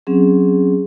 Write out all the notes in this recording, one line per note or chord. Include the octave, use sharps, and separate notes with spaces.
F#3 C4 C#4 G#4